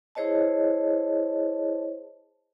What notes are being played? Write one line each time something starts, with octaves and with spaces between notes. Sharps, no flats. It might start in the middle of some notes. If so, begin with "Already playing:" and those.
E4 G#4 C5 C#5 D#5 A5